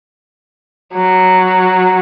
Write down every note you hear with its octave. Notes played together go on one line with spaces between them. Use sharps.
F#3